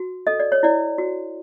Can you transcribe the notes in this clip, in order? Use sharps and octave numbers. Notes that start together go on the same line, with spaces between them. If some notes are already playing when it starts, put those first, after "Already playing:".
Already playing: F#4
A4 D#5
D5
C#5
E4 D5
F#4